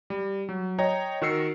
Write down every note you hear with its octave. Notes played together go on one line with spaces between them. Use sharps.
G3
F#3
C#5 D#5 G5 A#5
D#3 F#4 A#4 E6 C7 C#7